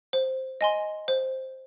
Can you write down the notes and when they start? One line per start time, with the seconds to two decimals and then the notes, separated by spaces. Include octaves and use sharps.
0.13 C5
0.61 D#5 G#5 C6
1.08 C5